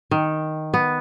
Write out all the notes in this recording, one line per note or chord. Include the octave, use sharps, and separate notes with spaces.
D#3
B3